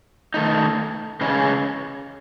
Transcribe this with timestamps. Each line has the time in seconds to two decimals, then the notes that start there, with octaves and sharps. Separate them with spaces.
0.34 D#3 A3 D#4
1.21 C#3 E3 G#3 C#4